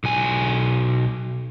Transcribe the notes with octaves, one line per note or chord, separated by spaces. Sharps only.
B1 G#5